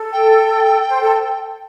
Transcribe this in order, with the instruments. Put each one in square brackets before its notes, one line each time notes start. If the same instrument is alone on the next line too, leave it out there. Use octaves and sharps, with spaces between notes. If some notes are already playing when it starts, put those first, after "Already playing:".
Already playing: [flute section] A4
[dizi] G5
[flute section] C5
A4